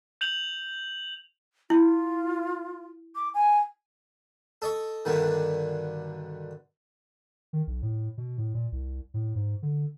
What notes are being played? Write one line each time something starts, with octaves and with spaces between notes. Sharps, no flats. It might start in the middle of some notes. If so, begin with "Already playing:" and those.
G6 F7 F#7
E4 F4
D6
G#5
A4 D#5 C#6
G2 B2 D3 D#3
D#3
B1
A2
B2
A2
A#2
C2
A2
G#2
D3